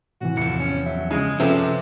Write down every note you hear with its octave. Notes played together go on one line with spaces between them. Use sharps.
A2 C3 E3 F#4
E2 F3 C#7
C#4
F#3 E5
C#3 G#3
C3 F3 C#4 F4 A4 B4